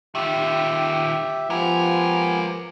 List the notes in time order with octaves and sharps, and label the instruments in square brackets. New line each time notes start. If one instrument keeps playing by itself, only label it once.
[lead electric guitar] D#3 F4 [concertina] G4 E5
[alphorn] F3 [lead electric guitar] G#3 A#4 [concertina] B3 G4 G#5